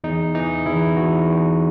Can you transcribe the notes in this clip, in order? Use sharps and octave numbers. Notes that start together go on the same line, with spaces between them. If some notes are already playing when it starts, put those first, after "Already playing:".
E2 D#4
E3 D#4
E2 E4
E2 F#4
E2